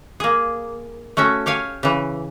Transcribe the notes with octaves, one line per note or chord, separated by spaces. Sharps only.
A#3 G#4
A3 C#4 F#4 E5
G4 C#5 F5 G#5
C#3 E3